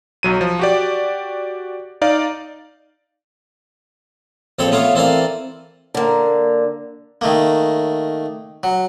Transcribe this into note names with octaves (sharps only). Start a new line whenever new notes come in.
B1 F#3 D#7
F3
F#4 G4 D5
D#4 D5 F5
A#1 C4 A4 C#5 G5 B5
A3 B3 F4 C#5 F5
E3 C4 A4 A#4 D5 F5
D3 A#3
D#3 A3 A#3
F#3